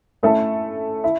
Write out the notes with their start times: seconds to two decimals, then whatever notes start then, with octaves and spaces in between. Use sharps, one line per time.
0.23 A3 C#4 E4 A4
1.04 E4